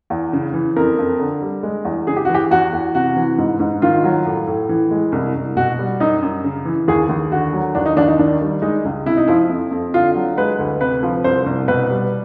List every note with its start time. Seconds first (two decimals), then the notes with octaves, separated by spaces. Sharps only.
0.10 E2
0.33 C#3
0.54 E3
0.76 F2 A#4
0.98 F2
1.19 D3
1.42 G3
1.63 G#3
1.85 E2
2.07 C#3 G#4
2.17 G4
2.25 E3 F#4
2.34 G4
2.51 E2 F#4
2.73 E2
2.95 C3 F#4
3.17 E3
3.38 G#2
3.60 G#2
3.82 D#3 F4
4.04 F#3
4.26 A2
4.47 A2
4.69 E3
4.91 G#3
5.12 C2
5.35 C2
5.57 B2 F#4
5.79 G3
6.00 F#2 D#4
6.22 F#2
6.44 C#3
6.65 E3
6.88 D#2 G#4
7.09 D#2
7.32 D3 F#4
7.53 F#3
7.75 D#2 D4
7.86 D#4
7.97 D#2 D4
8.08 D#4
8.19 D#3 D4
8.41 G3
8.62 G#3 D#4
8.85 C#2
9.06 C3 E4
9.17 D#4
9.28 F3 E4
9.49 F2
9.71 F2
9.94 D3 F4
10.15 F#3
10.37 G#3 B4
10.59 D2
10.81 C3 B4
11.03 F3
11.24 C2 C5
11.46 C2
11.68 B2 B4
11.90 G3